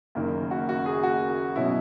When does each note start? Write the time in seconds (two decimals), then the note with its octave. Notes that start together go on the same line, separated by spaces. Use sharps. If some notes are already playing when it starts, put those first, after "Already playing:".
0.15 F#1 F#2 D#3 A#3
0.51 F#4
0.69 F#4
0.86 G#4
1.03 F#4
1.56 B2 F#3 C#4 E4